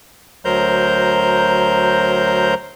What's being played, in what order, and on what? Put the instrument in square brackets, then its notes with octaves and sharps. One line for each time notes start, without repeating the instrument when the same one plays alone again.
[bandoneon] D2 F#3 A#4 C5 A#5 G6